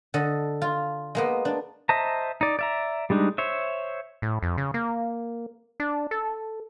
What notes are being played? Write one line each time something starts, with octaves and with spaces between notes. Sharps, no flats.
D3 A4 D#5
F4
G#3 A#3 B3
D4
C5 D#5 E5 A5 A#5
D#4 D5
D5 E5 A#5
G3 G#3 D4 D#4
C5 C#5 E5
A2
F2
C#3
A#3
D4
A4